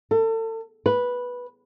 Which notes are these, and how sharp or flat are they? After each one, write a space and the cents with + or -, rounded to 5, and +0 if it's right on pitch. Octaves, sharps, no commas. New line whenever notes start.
A4 +35
B4 -10